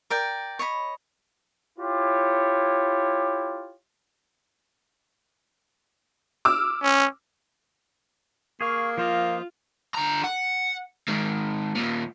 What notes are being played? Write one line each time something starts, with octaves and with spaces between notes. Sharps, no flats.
A#4 D5 G5
C#5 D#5 B5
E4 F4 G4 C#5
D6 E6 F6
C#4
A#3 G#4 F5 C#6
F3 F4 C5 D#5 F5
D3 A#5
F#5
G#2 D#3
D#2 A#2